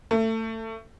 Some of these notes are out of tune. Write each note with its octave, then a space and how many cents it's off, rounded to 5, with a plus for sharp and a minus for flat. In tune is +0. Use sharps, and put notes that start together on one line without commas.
A3 +25